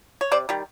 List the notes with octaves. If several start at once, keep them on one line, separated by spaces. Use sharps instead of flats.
C#5
C3 C5 D5
D#3 G3